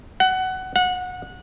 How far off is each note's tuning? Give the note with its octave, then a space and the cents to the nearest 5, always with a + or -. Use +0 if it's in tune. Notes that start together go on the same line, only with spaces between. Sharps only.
F#5 +20
F#5 -20